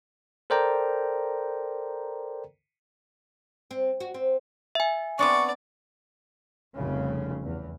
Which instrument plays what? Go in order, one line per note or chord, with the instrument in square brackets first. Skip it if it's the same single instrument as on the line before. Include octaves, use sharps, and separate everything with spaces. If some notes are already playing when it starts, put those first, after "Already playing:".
[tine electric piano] A4 A#4 C5 D5 G5 A#5
[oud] C4
F#4
C4
[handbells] E5 G#5
[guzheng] B3 C4 D4 [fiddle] D5 [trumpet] C#6
[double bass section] F1 C2 F2 C#3
E2